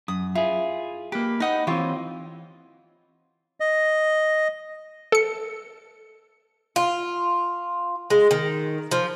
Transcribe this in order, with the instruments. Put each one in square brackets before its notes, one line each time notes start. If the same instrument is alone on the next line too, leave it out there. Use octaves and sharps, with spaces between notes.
[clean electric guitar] F#2 [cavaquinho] D#6
[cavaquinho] E4 [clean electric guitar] F4 G#4
[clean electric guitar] A#3 G4 [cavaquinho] B4
[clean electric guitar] D#4 D#5 [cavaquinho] B4 F#5 D#6
[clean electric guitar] E3 C4 [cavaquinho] F4 G4 C#5
[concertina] D#5
[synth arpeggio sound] A4 C#7
[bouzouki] F4
G#3
D#3
F3